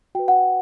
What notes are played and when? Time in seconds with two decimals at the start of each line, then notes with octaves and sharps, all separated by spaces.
0.15 F#4 B4 G5
0.28 F#5